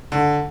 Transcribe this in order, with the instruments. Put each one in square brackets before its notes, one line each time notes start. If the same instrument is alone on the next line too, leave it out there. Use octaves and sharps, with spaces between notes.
[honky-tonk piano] D3